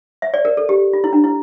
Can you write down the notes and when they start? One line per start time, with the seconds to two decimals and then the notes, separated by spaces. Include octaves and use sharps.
0.22 E5
0.34 D5
0.45 A#4
0.57 A4
0.69 G4
0.93 F4
1.04 E4
1.13 D4
1.24 E4